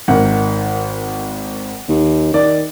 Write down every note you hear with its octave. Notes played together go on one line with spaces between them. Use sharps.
G#1 D#3 F#5
D#2
D#3 D5